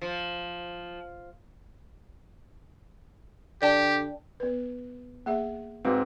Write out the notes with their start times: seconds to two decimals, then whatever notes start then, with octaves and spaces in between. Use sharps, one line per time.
0.02 F3
3.62 D3 G4 D5 G5 A5
4.40 B3 B4
5.26 A#3 G#4 E5
5.85 G#2 C4 F#4 B4 F5